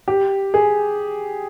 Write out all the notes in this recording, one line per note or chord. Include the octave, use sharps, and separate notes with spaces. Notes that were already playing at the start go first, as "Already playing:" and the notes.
G4
G#4